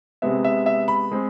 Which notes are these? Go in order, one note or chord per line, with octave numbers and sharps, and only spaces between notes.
C3 G#3 B3 E5
E5
E5
B5
G#3 C4